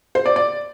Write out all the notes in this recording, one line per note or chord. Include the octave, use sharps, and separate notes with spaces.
C5
D5
D5